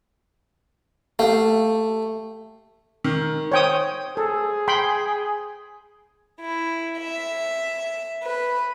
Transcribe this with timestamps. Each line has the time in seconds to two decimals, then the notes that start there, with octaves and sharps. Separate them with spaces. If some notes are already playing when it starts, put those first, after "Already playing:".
1.19 A3 G4 F5
3.04 D#3
3.52 C5 C#5 G5 D#6
4.17 G#4 A4
4.68 G5 B5 C6
6.42 E4
6.99 E5
8.23 B4